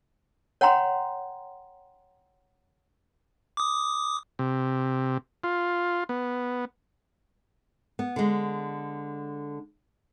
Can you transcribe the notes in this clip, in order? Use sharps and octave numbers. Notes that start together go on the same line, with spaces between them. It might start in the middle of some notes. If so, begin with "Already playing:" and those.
C#5 F#5 G5 A#5 C6
D6 D#6
C3
F4
B3
B3
D3 G#3